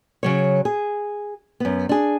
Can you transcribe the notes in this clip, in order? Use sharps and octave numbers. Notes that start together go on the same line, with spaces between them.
C#3 F#3 C#5
G#4
F#2 B3
D4 G#4